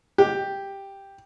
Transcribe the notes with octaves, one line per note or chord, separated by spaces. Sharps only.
G4